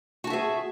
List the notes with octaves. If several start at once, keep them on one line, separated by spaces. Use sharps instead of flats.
F#4 G#4 E5 A5